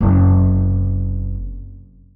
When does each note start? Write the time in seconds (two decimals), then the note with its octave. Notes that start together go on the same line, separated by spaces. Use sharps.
0.01 F#1 C3